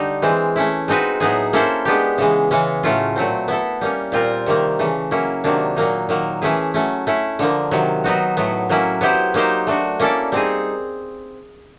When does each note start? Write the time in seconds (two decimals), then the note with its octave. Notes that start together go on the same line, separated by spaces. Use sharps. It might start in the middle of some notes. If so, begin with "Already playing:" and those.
Already playing: D3 G3 D#4 G4
0.22 E3 G#3 C4
0.56 A3 C#4 E4
0.88 G#3 C4 D#4 F#4 B4
1.20 A2 F#3 B3 D#4 G#4
1.53 A#3 C#4 E4 A4 C5
1.85 G#3 B3 D4 G4
2.18 C#3 E3 G#3
2.51 C#3 E3 G#3 C#4
2.83 A2 F#3 A3 C#4 F4
3.16 A#2 F#3 A3 C4
3.48 B3 E4 A4
3.81 G3 A#3 C#4
4.12 A#2 G3 C4 F4 A#4
4.46 C3 D#3 G3 A#3
4.79 C#3 E3 A3
5.11 F#3 A#3 C#4 E4
5.44 C3 D#3 F#3 A#3 D4
5.76 A#2 F#3 A#3 D#4
6.09 D#3 F#3 A#3
6.42 E3 A3 C#4 E4 G#4
6.74 F#3 A3 C#4
7.07 A3 C#4 E4
7.39 D3 F3 A#3
7.71 C3 D#3 F#3
8.04 F#3 B3 D#4 F#4
8.37 A2 F#3 B3
8.69 A2 F#3 A#3 C#4 E4
9.01 F#3 B3 E4 G4 C5
9.34 F#3 A#3 D#4 G4 C5
9.67 A3 D4 F#4
10.00 A#3 C#4 E4 A4 D5
10.32 G3 C4 D#4 G#4